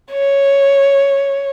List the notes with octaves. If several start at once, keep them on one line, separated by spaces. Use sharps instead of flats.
C#5